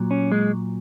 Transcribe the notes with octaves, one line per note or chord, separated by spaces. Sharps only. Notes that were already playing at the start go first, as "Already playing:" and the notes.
Already playing: A#2 F#3
C#4
G#3